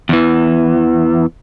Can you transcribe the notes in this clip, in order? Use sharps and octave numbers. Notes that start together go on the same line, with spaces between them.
E2 E3